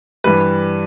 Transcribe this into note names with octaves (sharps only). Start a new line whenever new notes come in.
G2 E3 G3 B4